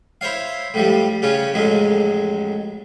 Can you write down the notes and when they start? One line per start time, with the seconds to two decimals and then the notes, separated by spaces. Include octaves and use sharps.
0.21 E4 C5 C#5 F5
0.74 A2 F3 G3
1.22 C#3 C#4 F4 C#5
1.54 A1 F2 F#3 G#3